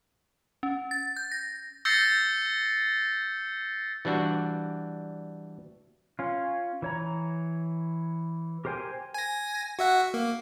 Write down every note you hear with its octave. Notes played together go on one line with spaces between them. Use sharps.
C#4
A6
G6
A#6
E6 G6 A6 A#6 C7 C#7
E3 G3 D4 F#4
C#4 F4
E3 C#5 A#5
G4 A#4 C5 G5 G#5
G#5 A#6
F#4 E5 F#5
A#3